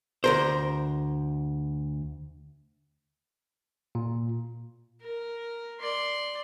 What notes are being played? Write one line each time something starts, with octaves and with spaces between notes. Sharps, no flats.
D2 A#4 C5
A#2
A#4
D5 C6